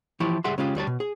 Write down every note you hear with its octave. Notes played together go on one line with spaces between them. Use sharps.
E3 F3 E4 G4 C#5
C#2 G3 G#4 E5 F#5 C6
C#3 G#3 C#4 F4 G4
D2 G3 C#5 A5
B2
G#4